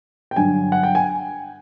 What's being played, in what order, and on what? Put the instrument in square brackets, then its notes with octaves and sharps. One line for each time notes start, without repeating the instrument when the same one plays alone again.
[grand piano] G5
G2 D3 F#3 G#5
F#5
G5
G#5